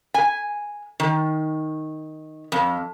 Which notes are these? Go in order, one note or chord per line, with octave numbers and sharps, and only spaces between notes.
G#5
D#3
F2